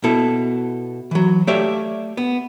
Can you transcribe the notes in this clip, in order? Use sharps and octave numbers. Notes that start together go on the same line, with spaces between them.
B2 E4 A4
E3 F#3
A3 G4 C#5 D5 E5 F5
B3